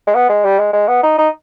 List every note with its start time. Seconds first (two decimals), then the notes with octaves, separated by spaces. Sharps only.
0.07 G#3
0.15 B3
0.29 G#3
0.45 G3
0.59 G#3
0.73 G#3
0.88 B3
1.03 D#4
1.18 D#4